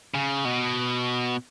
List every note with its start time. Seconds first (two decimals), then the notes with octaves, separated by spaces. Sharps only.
0.14 C#3
0.45 B2